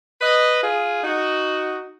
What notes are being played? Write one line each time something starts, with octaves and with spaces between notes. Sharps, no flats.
B4 D#5
F4 G#4
D#4 F#4